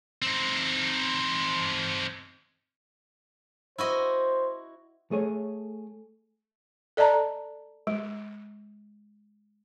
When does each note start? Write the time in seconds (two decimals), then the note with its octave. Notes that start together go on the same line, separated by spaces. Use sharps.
0.22 C4 D#4
3.78 E4 F#4 C5 D#5
5.11 A3 G#4 C#5
6.97 A4 D5 D#5 A5 A#5
7.87 G#3